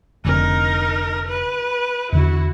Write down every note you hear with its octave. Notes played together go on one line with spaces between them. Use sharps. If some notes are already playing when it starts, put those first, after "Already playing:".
F1 D3 C4 D#4 A#4
B4
E2 D3 E4 F#4